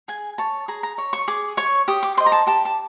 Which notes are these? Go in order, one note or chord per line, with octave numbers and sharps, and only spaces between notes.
G#4 G#5
C#5 A5
G#4 A#5
A#5
C#5
C#6
G#4 D6
C#5 C#6
G4 D#6
D6
C5 D#5 C6
A#5
A5
G4 A5
A5